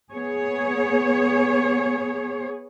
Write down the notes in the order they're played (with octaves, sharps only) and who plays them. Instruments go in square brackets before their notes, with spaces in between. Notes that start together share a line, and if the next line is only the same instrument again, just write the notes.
[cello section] B3 G#4 C#5